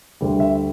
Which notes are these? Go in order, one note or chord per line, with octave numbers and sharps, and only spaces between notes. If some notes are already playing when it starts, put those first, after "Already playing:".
D2 D3 G3
E5